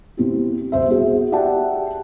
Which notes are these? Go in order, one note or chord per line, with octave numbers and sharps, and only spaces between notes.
B2 C4 E4 G4
C2 C5 E5
B3 F#4 G#4
G4 D5 E5 F#5 G5 A5